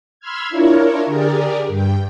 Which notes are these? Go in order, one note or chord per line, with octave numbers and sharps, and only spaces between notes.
B5 C6 E6 F6 G#6
D4 E4 F4 A#4 C#5
D3 G4 G#4 A#4 D5
G2 G5